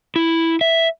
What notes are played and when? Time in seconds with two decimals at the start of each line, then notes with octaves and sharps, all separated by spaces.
0.16 E4
0.61 E5